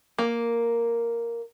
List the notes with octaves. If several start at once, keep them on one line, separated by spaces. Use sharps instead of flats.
A#3